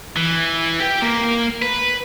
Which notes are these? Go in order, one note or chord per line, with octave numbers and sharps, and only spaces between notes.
E3
G4 G5
A#3
B4